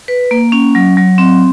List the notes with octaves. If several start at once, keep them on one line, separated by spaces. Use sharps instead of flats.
B4
A#3
C#4
F#3
F#3
C4